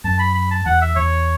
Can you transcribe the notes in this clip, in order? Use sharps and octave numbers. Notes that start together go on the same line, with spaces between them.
F#2 A5
B5
B5
A5
E2 F#5
E5
E2 C#5